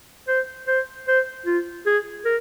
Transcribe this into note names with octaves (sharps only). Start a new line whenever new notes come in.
C5
C5
C5
F4
G#4
A#4